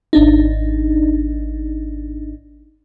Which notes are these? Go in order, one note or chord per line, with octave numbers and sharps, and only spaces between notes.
G#1 D4 D#4